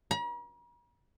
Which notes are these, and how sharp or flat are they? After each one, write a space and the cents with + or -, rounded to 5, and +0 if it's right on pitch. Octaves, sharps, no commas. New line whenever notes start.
A#5 +45